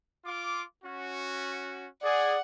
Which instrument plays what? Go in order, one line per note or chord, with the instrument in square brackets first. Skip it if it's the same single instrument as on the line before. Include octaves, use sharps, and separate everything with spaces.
[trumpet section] F4 D6
C#4 F#4
[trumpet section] G#4 [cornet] D5 [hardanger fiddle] F#5